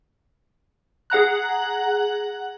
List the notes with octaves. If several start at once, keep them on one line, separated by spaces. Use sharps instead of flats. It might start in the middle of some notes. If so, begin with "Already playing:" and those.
G#4 F#5 A#5 F#6